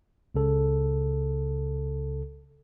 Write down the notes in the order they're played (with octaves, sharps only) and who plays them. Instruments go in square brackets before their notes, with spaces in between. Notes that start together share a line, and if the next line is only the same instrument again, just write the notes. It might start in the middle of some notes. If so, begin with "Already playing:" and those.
[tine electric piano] C#2 C#3 A4